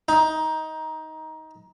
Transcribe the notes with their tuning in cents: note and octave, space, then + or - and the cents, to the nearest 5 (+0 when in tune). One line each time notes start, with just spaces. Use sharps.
D#4 +15